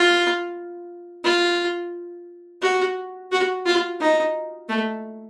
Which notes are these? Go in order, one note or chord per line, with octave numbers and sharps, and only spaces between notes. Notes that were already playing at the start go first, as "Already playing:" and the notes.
Already playing: F4
F4
F#4
F#4
F4
D#4
A3